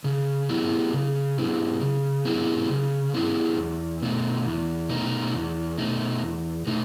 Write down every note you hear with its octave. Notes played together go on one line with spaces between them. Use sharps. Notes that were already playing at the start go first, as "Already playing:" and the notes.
C#3
F#3 B3 E4 G#4
C#3
F#3 B3 E4 G#4
C#3
F#3 B3 E4 G#4
C#3
F#3 B3 E4 G#4
E2
B2 A3 D#4
E2
B2 A3 D#4
E2
B2 A3 D#4
E2
B2 A3 D#4